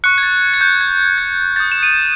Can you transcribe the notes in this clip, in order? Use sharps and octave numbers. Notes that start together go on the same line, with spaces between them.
C#6 F#6 C#7
G#6
A6
G#6
G6
G#6
G#6
D#6 G6 A6
E7
D#7